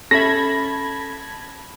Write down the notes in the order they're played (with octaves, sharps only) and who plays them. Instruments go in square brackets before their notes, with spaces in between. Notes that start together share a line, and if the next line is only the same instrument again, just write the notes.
[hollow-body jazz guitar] C#4 E5 [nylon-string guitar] A4 [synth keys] A5 B5 G#6 [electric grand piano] A#6